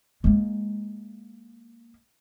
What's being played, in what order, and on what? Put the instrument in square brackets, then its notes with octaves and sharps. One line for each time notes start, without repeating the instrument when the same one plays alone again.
[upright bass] G#3 A#3